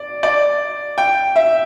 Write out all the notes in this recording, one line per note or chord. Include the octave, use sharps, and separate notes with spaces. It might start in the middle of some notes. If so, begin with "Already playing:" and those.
Already playing: D5
D5
G5
E5